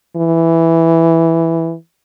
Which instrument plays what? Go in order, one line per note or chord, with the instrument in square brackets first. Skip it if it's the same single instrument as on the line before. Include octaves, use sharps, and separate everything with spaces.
[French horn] E3